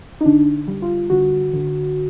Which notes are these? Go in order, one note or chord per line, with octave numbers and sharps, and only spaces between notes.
D#4
D3 D4
G3
F4
D3 F#4
D3